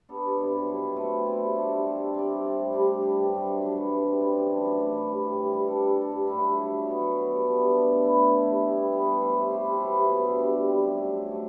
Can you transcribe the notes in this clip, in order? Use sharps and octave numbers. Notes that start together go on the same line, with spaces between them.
B3 D4 A4
G2
F#3 C4 E4
G2
F#3 C4 E4
B2
A3 C4 E4
B2
A3 C4 E4
G3
D4 A4 C5
G3
D4 A4 C5
G3
C4 G4 D5
G3
C4 G4 D5
A2
G3 D4 G4
A2
G3 D4 G4
G2
F#3 A3 D4
G2
F#3 A3 D4
E3
G3 C4
E3
G3 C4
F#2
E3 A3 D4
F#2
E3 A3 D4
A2
E3 G3
A2
E3 G3
G3
D4 A4
G3
D4 A4
G2
F#3 A3 E4
G2
F#3 A3 E4
F#3
B3 F#4
F#3
B3 F#4
G3
B3 D4 A4
G3
B3 D4 A4
A2
E3 A3 E4
A2
E3 A3 E4
G3
B3 E4 B4
G3
B3 E4 B4
A3
E4 G4 C5
A3
E4 G4 C5
C3
F#3 B3 E4
C3
F#3 B3 E4
D3
G3 C4 G4
D3
G3 C4 G4
F#2
F#3 A3
F#2
F#3 A3